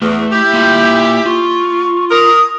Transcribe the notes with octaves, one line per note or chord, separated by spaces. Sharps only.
E2 A3
E4 G4 G6
A#3 F4 G5
F4 C#6
A#4 D#6